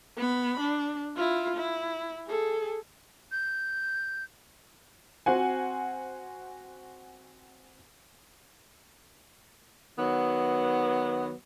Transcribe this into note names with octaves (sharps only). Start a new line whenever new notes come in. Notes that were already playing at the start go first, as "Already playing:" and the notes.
B3 B5
D4
E4 F4
E4
G#4 A4
G6
C4 F#4 C5 F#5 G#5
D#3 F#3 B3